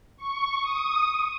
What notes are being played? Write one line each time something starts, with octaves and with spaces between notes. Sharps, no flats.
C#6
D#6